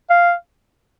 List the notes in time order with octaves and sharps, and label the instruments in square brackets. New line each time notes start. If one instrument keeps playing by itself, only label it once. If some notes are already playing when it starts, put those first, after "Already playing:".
[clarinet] F5